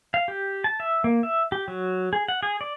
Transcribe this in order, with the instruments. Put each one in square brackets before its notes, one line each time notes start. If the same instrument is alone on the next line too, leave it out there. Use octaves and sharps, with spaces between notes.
[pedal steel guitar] F5
G4
A5
E5
A#3
E5
G4
F#3
G#4
F#5
G#4
D5